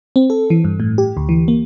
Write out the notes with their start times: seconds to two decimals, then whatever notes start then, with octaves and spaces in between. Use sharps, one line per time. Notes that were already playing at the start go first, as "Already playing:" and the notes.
0.16 C4
0.30 A4
0.50 E3
0.64 G2
0.80 A2
0.98 G4
1.17 D2
1.29 E3
1.48 A#3